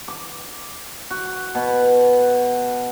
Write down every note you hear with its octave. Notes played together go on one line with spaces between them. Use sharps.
D6
F#4
B2